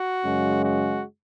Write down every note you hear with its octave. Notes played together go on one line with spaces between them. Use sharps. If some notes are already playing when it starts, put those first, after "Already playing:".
Already playing: F#4
F#2 C#3 G#3
F#4